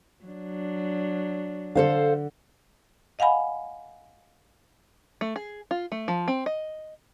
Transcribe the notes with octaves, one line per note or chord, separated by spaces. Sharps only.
F#3 D4
D3 A4 C5 F5
D#5 F5 F#5 G#5 B5
A3
G#4
F4
A3
F3
C4
D#5